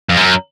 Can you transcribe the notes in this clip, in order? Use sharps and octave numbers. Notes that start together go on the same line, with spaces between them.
F2
F#2